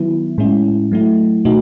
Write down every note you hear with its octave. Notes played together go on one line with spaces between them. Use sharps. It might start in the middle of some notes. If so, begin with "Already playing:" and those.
Already playing: D#3 F#3 B3 E4
A2 G#3 C#4 E4
F#3 A3 E4
B2 A3 D#4 F#4